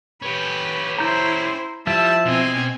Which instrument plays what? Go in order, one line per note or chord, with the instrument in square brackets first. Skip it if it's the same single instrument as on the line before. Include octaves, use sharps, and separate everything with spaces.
[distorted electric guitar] C#4 G4 [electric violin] B4
[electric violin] E4 C5 [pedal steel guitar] A#5 G6
[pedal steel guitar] F3 E4 E5 [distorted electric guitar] G3 [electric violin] A5
[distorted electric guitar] B2 D#5 [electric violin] C4 G#5